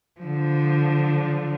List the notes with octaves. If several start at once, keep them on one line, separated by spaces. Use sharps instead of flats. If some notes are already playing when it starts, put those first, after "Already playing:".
D3 F3